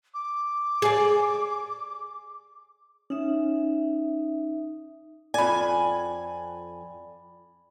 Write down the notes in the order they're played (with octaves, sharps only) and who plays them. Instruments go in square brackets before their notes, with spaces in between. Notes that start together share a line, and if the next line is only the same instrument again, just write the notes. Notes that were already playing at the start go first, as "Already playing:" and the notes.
[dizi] D6
[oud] G#4 D5
[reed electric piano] C#4 [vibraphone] D#4 E5
[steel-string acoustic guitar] F2 G#5 [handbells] D5 B5